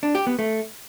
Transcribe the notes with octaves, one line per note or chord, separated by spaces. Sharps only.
D4
G4
B3
A3